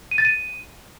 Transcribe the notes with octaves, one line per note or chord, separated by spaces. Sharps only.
D#7
A6
D#7